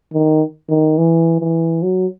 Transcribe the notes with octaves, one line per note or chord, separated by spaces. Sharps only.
D#3
D#3
E3
E3
F#3